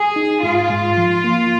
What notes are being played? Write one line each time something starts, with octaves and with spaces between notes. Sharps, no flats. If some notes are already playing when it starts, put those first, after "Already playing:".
Already playing: G#4
D#4
G#2 F4
G#2
F3
A#3